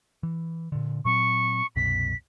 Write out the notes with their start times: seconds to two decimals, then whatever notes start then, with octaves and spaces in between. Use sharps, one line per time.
0.23 E3
0.72 A#2 D3
1.05 A#2 F#3 C4 C#6
1.76 C2 F#2 B2 B6